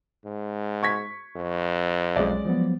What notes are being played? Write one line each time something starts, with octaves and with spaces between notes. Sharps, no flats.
G#2
C#6 G#6 B6
F2
B1 F#3 G#3 C#4 D5
F3 F#3 B3